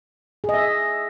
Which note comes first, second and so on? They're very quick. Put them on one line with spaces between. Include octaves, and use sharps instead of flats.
G#4 D#5 E5